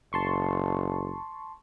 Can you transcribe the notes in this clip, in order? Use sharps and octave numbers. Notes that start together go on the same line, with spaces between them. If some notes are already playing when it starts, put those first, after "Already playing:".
F#1 A5 C6 C#6